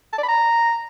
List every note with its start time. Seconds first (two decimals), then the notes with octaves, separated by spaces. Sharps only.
0.13 A5
0.18 D5
0.23 B5
0.28 A#5